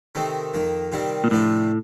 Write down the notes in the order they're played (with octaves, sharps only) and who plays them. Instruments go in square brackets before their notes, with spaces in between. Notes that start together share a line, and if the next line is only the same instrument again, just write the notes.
[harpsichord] C3 D#3 A3 C4 D#4
F2 D#3 A#3
C3 D#3 G3 C4 F4
[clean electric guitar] A#2
[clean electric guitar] A2 [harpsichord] C3 F3 A3 D4 F4